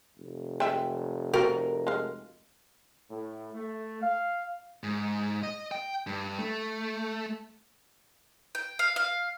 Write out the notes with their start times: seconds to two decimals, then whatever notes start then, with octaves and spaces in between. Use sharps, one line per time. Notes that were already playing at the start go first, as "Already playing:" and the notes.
0.17 F1
0.60 G#3 E5 G5
1.34 F4 F#4 A#4 G5
1.87 G#3 F5
3.11 A2
3.54 A3
4.02 F5
4.83 G#2
5.43 D#5
5.72 G5
6.07 G2
6.38 A3
8.55 G5
8.79 F5
8.96 F5